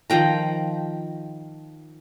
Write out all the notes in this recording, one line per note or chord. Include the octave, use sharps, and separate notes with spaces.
D#3 F3 G5 A#5